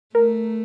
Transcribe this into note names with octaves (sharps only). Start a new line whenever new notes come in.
A3 A#4